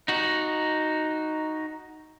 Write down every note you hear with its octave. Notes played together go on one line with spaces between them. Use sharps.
D#4 F#4